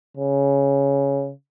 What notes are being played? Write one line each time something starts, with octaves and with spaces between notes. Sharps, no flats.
C#3